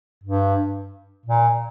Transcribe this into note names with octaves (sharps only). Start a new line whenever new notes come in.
G2
A#2